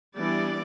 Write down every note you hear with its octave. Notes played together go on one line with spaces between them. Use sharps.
E3 G3 B3 D4 D5